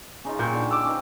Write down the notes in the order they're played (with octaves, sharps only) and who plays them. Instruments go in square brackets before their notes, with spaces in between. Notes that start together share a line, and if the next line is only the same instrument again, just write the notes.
[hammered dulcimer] C#3 D#4 F4
[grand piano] A#2 G6 [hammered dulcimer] G4 C#6
[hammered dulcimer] D3
[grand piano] D6 E6
[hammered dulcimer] C#4 D#4 C5